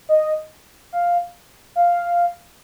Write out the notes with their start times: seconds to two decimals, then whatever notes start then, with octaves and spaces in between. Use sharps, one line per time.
0.09 D#5
0.93 F5
1.76 F5